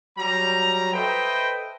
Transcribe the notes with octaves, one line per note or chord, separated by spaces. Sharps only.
F#3 G3 A#5
A4 B4 C5 D#5 E5 G5